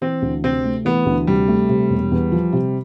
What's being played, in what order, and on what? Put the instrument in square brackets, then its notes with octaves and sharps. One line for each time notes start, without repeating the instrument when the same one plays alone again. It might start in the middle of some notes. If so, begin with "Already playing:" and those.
[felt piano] E3 [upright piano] C4
[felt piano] D2
[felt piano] C3 [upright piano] C4
[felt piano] A3
[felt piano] E3 [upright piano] B3
[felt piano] D2
[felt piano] C3 [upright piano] G3
[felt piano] A3
C3
E1
E2
F3
C3